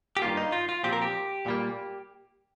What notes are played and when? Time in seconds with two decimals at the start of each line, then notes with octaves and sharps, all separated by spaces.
0.17 G4
0.22 G2 D#3 A#3 F4
0.37 D#4
0.52 F4
0.69 F4
0.83 A#2 F3 C4 G4
0.93 A#4
1.02 G4
1.46 A#2 G3 A#3